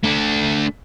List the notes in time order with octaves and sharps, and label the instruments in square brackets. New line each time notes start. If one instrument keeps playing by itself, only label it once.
[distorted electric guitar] A3 D4